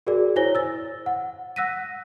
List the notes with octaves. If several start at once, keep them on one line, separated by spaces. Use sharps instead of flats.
F#4 G#4 A#4 D5
E4 C5 C#5 G#5 A#6 G7
E6 A6
F#5
F#5 E6 F#6 A#6 B6 D#7